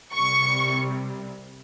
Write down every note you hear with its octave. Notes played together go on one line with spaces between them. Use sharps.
C2 C3 G3 C#6